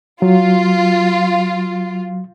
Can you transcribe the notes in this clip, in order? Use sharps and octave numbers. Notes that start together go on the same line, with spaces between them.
F#3 F4